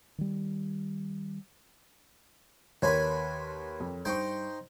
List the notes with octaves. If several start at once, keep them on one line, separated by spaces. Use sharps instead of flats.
D#3 G3
D#2 A#4 B4 C#5 G#5 B5 C6
F2
G2 D#4 C5 G5 C#6